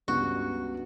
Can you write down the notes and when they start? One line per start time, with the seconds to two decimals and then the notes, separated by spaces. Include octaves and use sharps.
0.08 C#2 G2 B3 F#4